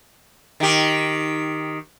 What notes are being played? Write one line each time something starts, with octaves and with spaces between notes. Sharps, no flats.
D#3 G4